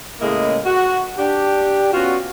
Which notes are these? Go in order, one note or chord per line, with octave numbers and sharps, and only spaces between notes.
A2 C#3 G#3 A#3 E4 D#5
F#4
D4 G4
B3 C#4 F4 F#4